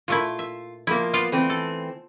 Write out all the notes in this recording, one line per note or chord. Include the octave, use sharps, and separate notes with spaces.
A#2 A3 E4 F4
E5
F3 A3 A#3 E4
B3 F4 D5
E3 A3 C4
A4